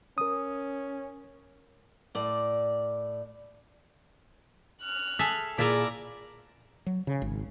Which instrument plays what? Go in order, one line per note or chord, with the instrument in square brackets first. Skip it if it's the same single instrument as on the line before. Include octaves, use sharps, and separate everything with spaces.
[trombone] C#4 [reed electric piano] A#4 D#6
[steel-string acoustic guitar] A2 D5
[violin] F6 F#6
[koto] G#4 A4 E5
[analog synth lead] A#2 [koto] E4 F4 E5 [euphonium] G#4 [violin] D5 A#5
[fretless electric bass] F#3
C#3
G#1